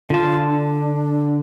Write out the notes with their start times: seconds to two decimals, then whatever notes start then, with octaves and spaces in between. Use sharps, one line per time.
0.10 D3 F4 A5
0.49 D4